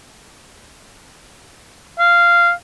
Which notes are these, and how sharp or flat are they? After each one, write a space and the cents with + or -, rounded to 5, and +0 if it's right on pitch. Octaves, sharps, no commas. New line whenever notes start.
F5 -10